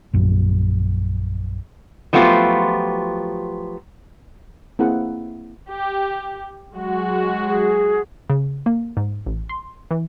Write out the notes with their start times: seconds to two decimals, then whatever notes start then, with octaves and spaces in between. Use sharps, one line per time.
0.13 A#1 F#2
2.13 F3 F#3 A3 B3 F4 G4
4.79 A#3 C4 E4 G#4 F#5
5.69 G4
6.74 F#3 G#3 F#4
7.47 G#4
8.30 C#3
8.66 A#3
8.97 G#2
9.26 A1
9.49 C6
9.91 E3